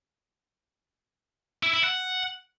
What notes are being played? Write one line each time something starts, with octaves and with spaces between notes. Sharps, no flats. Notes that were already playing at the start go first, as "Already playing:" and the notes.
E4
E4
F#5